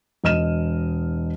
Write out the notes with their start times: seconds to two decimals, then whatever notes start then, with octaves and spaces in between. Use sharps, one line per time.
0.24 E1 D#5 F6 D#7 E7